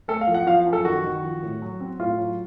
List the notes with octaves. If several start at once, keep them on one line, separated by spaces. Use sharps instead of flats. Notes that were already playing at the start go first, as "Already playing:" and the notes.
A3 A4
F5
F3
F#5
F3 F5
F#2
A4
D#3 F#4
D#3
F3
A2
F#3
C4
A2 F4
F#3